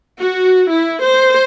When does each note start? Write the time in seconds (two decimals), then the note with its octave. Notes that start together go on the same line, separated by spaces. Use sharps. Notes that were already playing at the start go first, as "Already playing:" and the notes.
0.20 F#4
0.72 E4
1.04 C5